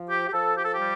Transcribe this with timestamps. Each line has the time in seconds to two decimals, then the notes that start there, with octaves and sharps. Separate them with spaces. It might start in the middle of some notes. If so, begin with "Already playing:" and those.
Already playing: F3
0.10 G4
0.28 G4
0.33 F3 A4
0.56 G4
0.64 A4
0.73 G4
0.79 G3